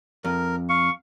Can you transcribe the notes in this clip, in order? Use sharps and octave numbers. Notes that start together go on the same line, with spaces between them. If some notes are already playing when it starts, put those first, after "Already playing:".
F2 A#4
F5 C#6